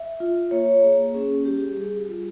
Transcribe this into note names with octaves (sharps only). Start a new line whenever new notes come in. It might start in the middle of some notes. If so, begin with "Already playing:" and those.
Already playing: E5
F4
A#3 C#5
A#3 G#4
C#4 G#4
G3 G4
G3 G#4
F4